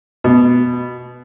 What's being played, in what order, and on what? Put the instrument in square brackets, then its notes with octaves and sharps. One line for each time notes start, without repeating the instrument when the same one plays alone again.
[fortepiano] B2